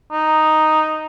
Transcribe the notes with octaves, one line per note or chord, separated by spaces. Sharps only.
D#4